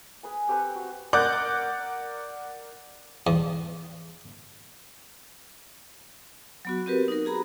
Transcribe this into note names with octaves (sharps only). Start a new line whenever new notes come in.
G#4 B4 G#5
C4 G4 A4 B4
F#4
A#4 D5 F#5 D6 F#6 G6
E2
F#3 B3 F#4
C4 F#4 G4 A#4 B4
D#4 A#4
F#4 G#4 A#5 B5